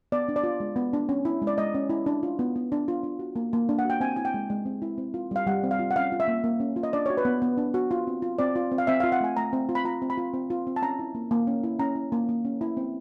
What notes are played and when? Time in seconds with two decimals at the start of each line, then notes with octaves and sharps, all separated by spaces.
0.12 B3 D5
0.29 D4
0.36 D5
0.44 F4
0.60 G#3
0.76 B3
0.93 D4
1.09 C#4
1.25 E4
1.42 G#3
1.47 D5
1.58 G#3 D#5
1.75 C#4
1.90 E4
2.06 D4
2.23 F4
2.39 B3
2.56 B3
2.72 D4
2.88 F4
3.03 D4
3.19 F#4
3.36 A#3
3.53 A#3
3.69 D4
3.79 F#5
3.85 F#4 G5
4.00 C4 G#5
4.16 E4 G#5
4.25 G5
4.34 G#3
4.50 G#3
4.66 C4
4.82 E4
4.98 C4
5.14 F4
5.31 G3 F5
5.47 G3 F#5
5.63 C4
5.71 F5
5.79 F4
5.91 F#5
5.96 C#4 F5
6.12 F4
6.20 E5
6.28 A#3
6.44 A#3
6.60 C#4
6.76 F4
6.83 D#5
6.93 D4 D5
7.06 C#5
7.10 F#4
7.17 B4
7.25 B3
7.42 B3
7.58 D4
7.74 F#4
7.91 F4
8.07 C4
8.22 F4
8.39 C4 D5
8.56 F4
8.72 C4
8.78 F5
8.87 C4 E5
9.00 F5
9.04 F4
9.12 F#5
9.21 A3 G#5
9.37 A3 A#5
9.53 C4
9.69 F4
9.75 B5
9.85 F4 A#5
10.02 C4
10.10 B5
10.18 F4
10.34 C4
10.50 F4
10.67 C4
10.76 A5
10.82 C#4 A#5
10.99 E4
11.15 A#3
11.31 A#3
11.47 C#4
11.64 E4
11.79 C#4 A#5
11.96 E4
12.12 A#3
12.29 A#3
12.45 C#4
12.61 E4
12.77 C4